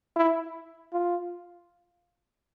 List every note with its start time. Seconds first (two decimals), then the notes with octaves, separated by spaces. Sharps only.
0.16 E4
0.93 F4